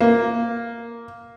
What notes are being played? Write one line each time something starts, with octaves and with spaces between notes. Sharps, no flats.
A#3